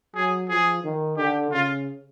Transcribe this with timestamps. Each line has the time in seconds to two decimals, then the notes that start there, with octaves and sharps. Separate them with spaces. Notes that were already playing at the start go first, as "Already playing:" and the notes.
0.16 F#3 G#4
0.50 F3 G#4
0.84 D#3
1.18 D3 G4
1.51 C#3 F4